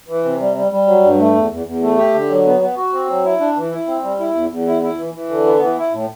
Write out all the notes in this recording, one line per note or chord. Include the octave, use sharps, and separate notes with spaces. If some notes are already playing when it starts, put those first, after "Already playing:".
E3
C3
G3
G3
G3
F#3
G2
A3
E2
E2
E2
A3
G4
D3
F#3
B3
B3
F#4
C4
F#3
E4
D4
E3
E4
C4
G3
E4
E2
E2
E4
E4
E3
E3
D3
B3
E3
E4
A2